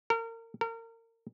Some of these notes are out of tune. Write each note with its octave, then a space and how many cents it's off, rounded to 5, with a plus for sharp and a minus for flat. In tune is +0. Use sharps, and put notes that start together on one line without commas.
A#4 -30
A#4 -30